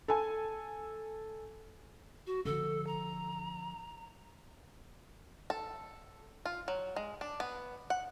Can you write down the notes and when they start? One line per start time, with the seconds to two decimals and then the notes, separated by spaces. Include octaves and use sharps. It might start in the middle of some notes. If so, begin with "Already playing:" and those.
0.08 A4 G#5
2.27 F#4
2.45 D3 F3 A4
2.87 A#5
5.50 A4
6.45 F4
6.68 F#3
6.96 G#3
7.21 D4
7.40 B3
7.90 F#5